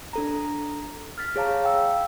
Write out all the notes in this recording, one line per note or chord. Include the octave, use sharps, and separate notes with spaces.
D4 A4 A#5
F6 A6 B6
G#4 C#5 F5 A5 A#5
F5 G5 E6